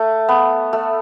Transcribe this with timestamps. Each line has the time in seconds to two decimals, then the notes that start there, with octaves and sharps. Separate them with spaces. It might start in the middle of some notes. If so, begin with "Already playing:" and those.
Already playing: A3
0.28 B3
0.73 A3